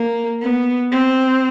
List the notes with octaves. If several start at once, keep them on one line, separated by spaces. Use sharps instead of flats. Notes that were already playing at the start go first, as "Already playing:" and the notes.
Already playing: A#3
B3
C4